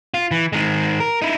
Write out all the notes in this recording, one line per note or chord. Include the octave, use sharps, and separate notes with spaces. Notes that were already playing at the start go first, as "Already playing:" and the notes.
F4
E3
D#3 G#3
A#4
D#4 E4